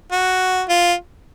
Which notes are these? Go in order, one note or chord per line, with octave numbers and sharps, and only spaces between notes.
F#4
F4